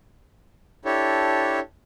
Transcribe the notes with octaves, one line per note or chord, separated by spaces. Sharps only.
D4 E4 G4 A4 C#5